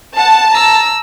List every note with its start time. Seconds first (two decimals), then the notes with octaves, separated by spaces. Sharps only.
0.16 F#5 A5
0.50 A#5 E6